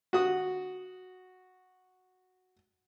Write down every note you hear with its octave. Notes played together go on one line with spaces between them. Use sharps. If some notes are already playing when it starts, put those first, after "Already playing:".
F#4 D#6